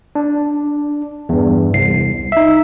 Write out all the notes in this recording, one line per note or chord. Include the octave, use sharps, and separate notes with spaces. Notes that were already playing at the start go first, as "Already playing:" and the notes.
D4
E2 G2
C2 C7
D#4 E5